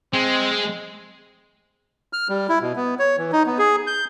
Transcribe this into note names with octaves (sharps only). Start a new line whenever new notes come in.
G#3 C4
F6
G3
E4
B2
B3
C#5
E3
D#4
B3
G#4
G6